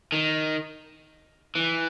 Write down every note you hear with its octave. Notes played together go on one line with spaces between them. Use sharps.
D#3
E3